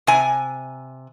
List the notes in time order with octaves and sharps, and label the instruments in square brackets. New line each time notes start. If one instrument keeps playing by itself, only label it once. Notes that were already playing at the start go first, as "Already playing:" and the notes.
[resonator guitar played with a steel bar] C3 G#5